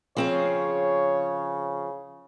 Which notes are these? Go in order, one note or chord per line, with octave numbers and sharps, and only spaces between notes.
C#3 F3 C4 G#4 C#5